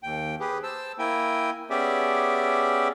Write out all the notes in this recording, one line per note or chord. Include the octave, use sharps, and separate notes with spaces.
D#2 G5
G4 G#4 B4
C5 A5 E6
A#3 E4 G5 G#5
B3 C#4 G4 G#4 D5 E5